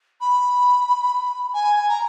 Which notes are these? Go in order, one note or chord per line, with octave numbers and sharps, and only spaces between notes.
B5
G#5
G#5
A#5